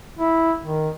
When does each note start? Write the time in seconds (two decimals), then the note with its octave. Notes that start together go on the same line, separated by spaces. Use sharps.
0.19 E4
0.64 D#3